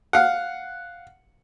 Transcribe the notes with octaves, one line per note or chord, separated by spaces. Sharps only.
F5 F#5